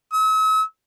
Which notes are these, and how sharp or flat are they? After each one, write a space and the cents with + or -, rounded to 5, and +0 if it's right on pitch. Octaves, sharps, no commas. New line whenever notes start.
E6 -45